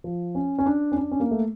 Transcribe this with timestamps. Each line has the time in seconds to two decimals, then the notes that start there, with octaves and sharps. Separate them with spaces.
0.04 F3
0.35 C#4
0.58 C#4
0.66 D4
0.92 C#4
0.96 D4
1.11 C#4
1.20 A#3
1.31 A3